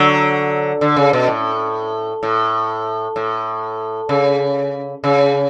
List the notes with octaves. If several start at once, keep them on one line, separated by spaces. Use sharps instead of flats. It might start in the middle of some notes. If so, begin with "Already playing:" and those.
Already playing: D3 F#3
D3
C#3
B2
A2
A2
A2
C#3
C#3